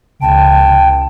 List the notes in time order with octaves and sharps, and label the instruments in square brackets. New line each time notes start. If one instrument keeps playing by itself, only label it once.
[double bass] C#2 C#3 [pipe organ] G5 [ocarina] A5